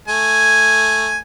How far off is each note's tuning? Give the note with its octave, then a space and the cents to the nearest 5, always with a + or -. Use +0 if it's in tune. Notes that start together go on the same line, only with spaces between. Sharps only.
A3 +0 G#5 +0